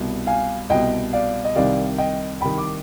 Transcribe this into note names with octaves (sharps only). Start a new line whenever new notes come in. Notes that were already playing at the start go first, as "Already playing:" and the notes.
Already playing: C2 B2
F5 G#5
C2 B2 D#5 G5
D5 F5
D#5
C2 C3 D#3 D5 F5
D#5 G5
C2 C3 D#3 G5 B5
D6